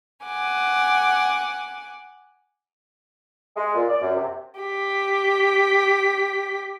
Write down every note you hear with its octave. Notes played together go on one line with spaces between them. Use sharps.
F#5 G#5 D6
G#3
A#2
D5
F#2
C3
G4 B6